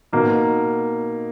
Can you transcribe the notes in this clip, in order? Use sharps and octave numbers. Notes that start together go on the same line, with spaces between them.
B2 A#3 D#4